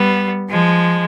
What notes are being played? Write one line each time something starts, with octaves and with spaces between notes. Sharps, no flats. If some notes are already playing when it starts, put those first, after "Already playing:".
Already playing: G3 B3
F3 G#3